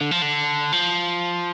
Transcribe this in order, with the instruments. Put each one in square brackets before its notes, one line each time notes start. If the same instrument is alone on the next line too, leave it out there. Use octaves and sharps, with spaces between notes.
[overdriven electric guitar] D3
F3
D3
F3